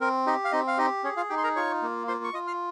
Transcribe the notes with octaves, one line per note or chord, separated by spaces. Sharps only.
C4 A#4
D#4 G4 D#5
F5
C4 D#4 D#5
F5
D#4 G4 D#5
C#4 G#4 C#5
F4 F5
D#4 G4 G5
C6
A#4 A#5
F4 C#5 C#6
A#3
F4 C5 C6
C#6
F4 D#5 D#6
F5 F6